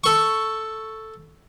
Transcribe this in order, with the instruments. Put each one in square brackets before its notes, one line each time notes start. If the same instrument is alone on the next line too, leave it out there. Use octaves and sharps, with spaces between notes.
[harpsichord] A4 C#6